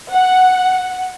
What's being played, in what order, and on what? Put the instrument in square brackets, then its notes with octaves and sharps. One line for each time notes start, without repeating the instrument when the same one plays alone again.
[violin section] F#5